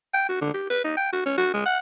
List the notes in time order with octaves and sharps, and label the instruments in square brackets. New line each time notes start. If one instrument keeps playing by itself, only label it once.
[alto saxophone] G5
F#4
D3
G4
B4
D#4
G5
F#4
C#4
F#4
G#3
F#5